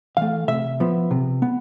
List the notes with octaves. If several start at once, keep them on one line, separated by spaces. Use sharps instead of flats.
E3 A3 F5
C3 E5
F3 B3
C3
B3